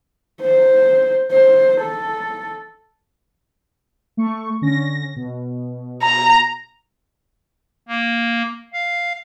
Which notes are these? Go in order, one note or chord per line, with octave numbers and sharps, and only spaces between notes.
C5
C5
A4
A3 C#6
D3 C#4 A#6
B2
A#5
A#3
F5